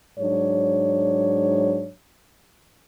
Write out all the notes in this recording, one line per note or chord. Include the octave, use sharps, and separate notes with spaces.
G#2 F#3 D4 C#5